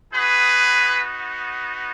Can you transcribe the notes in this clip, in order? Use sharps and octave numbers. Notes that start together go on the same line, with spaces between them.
B3 D#4 F#4 G#4 B4